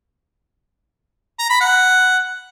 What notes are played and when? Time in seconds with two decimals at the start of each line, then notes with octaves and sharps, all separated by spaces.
1.39 A#5
1.50 B5
1.61 F#5